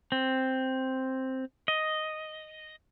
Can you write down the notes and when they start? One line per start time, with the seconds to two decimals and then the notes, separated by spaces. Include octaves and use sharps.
0.12 C4
1.68 D#5